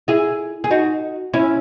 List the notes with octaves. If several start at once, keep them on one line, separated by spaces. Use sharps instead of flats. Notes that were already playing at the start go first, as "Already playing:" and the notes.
E4 G#4
G#4
D#4 F#4
C#4 E4